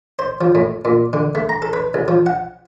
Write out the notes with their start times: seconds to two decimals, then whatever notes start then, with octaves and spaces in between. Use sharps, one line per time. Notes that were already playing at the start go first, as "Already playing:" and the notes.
0.19 C5
0.41 F3
0.55 A2
0.85 A#2
1.13 D3
1.35 A3
1.49 A#5
1.62 A4
1.73 B4
1.94 C2
2.08 F3
2.26 F#5